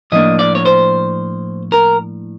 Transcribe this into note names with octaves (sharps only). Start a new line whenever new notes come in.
A2 F3 A#3 D4 D#5
D5
C#5
C5
A#4